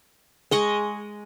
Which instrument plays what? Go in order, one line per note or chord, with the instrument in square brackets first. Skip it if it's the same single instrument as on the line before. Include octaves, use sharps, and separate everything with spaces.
[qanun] G#3 D#5 C#6 [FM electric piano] G#4